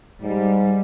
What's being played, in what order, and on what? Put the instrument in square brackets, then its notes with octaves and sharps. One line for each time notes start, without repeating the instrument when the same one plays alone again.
[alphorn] G#2 [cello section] G3